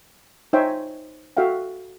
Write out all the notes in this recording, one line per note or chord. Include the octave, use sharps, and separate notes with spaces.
D#4 C5 C#5 E5 G5 G#5
F#4 A4 E5 F5 G5